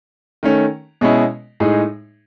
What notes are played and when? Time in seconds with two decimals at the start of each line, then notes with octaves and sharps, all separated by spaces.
0.43 D#3 A3 C#4
1.01 B2 G#3 C#4 E4
1.60 A2 G#3 D#4 G#4